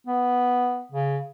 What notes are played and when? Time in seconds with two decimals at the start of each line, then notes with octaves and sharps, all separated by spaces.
0.07 B3
0.92 C#3